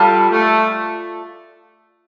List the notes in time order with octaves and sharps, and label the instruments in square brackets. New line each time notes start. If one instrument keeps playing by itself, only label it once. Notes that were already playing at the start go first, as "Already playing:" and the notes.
Already playing: [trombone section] G3 [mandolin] F4 A4 D5 A5
[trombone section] A3